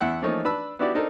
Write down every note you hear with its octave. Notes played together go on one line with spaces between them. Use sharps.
E2 E4 F#5 F#6
E3 F3 A3 A#3 D#4 C#5
D4 B4 A5 B5 E6
B3 D4 E4 F#4 G4 D5
C4 D4 D#4 A4 A#4